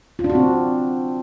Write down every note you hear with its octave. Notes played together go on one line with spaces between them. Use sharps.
F4
D4
F#4
C4